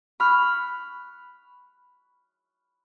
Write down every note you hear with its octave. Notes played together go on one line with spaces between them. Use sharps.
B5 C#6 F6 F#6